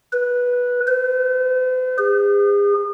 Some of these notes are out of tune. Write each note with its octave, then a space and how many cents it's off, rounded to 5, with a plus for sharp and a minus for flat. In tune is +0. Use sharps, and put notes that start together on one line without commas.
B4 -10
C5 -45
G#4 -40